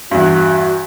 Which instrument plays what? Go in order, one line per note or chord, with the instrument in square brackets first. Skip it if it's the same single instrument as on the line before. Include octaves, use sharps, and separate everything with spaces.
[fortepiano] E2 G2 [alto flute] F#4